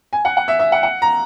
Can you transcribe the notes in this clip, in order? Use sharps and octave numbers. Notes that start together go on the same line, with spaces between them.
G#5
F#5
F#5
E5
E5
F#5
F#5
A#5